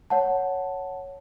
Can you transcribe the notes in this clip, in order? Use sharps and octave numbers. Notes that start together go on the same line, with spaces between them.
C#5 F#5 A5